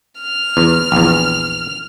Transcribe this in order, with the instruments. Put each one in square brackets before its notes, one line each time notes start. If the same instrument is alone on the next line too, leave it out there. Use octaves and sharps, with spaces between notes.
[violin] F6
[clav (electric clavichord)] E2
A#1 E2